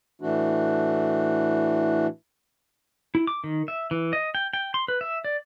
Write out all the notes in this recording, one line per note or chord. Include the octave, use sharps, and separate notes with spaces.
A2 E3 A3 D4 F#4
E4
D6
D#3
E5
E3
D#5
G5
G5
C6
B4
E5
D5